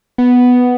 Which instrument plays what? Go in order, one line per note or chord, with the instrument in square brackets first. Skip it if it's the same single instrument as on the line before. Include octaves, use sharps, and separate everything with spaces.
[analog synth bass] B3